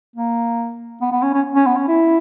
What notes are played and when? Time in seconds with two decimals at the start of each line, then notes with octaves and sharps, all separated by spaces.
0.16 A#3
1.02 B3
1.12 B3
1.22 C#4
1.33 C#4
1.55 C#4
1.66 B3
1.76 C#4
1.88 E4